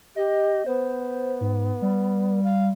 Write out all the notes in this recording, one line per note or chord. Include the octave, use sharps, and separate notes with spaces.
G4 D#5
B3 C5
G#2
G3
F5